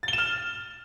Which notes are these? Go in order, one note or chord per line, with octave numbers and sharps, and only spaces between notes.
A6
G7
E7
F6